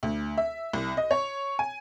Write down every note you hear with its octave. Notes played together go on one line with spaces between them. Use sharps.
D2
E5
C2
D#5
C#5
G#5